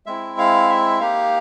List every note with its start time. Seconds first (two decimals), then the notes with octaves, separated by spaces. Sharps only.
0.06 G#3 C4 E4 E5
0.38 F5
0.69 E5
1.00 A#3 D#4 G4 F5